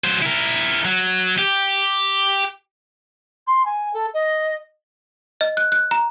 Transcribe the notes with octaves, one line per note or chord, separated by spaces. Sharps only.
F#3 C5
E4 A#4
F#3
G4
C6
G#5
A4
D#5
D#5
F#6
F#6
A#5